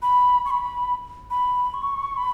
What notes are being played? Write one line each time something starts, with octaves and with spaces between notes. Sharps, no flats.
B5
C#6
B5
B5
C#6
B5